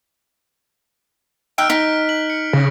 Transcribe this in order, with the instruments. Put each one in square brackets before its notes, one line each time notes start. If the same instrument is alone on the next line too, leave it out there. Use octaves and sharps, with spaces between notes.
[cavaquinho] D#4 E5 G5 [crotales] F6 F#6 D7
[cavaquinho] D#4 [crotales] B6
[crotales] F#7
C#7
[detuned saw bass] C#3 [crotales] A#6